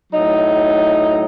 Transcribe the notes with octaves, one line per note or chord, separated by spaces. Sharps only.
A2 F#3 D#4